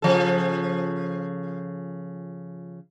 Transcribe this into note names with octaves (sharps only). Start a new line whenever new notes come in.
C#3 F3 A4